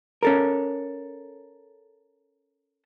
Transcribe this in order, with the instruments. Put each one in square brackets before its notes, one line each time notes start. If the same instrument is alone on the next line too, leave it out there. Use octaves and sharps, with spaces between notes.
[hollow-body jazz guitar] C#4 A4 A#4